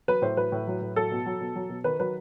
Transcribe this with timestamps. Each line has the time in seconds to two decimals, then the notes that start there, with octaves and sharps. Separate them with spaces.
0.08 F#3 B4
0.22 A2 C5
0.37 F#3 B4
0.52 A2
0.67 F#3
0.81 A2
0.96 F#3 A4
1.11 B2
1.26 F#3
1.41 B2
1.55 F#3
1.69 B2
1.84 D#3 B4
1.99 F#3 B4